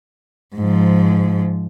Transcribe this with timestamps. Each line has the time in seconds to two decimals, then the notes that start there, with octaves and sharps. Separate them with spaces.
0.55 G#2 F3